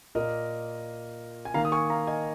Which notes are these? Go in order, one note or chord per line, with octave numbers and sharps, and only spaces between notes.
A#2 A#3 A#4 D#5
G#5
D#3 A#3 F5 A#5
D#6
G#5 C#6
F5 A#5
D#5 G#5